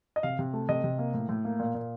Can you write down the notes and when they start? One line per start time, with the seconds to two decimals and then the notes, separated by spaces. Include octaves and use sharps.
0.16 D#5
0.23 C3 F5
0.39 C3
0.53 A3
0.69 C3 D#5
0.84 C3
0.99 A#3
1.14 A2
1.29 A2
1.45 A#3
1.59 A#2
1.75 A#2